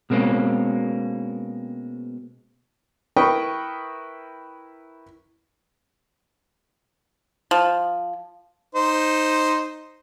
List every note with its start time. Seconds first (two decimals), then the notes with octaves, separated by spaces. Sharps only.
0.10 B2 G#3 A#3 C4 C#4
3.16 E4 A#4 B4 G5 C#6 D#6
7.51 F3
8.75 D#4 C5